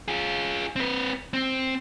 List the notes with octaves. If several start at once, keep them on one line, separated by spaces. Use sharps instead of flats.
F4 G#4
C4 B4
C4